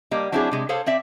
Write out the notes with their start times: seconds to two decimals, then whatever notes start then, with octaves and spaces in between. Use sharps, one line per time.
0.11 G3 A#3 D#5
0.32 F#3 C4 D4 E4 G4 G#4
0.51 C3 G#3
0.69 G#4 A4 C5 C#5 F5
0.86 C4 D5 E5